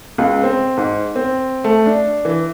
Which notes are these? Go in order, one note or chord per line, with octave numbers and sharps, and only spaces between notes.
C#2
C4
G#2
C4
A3
D4
E3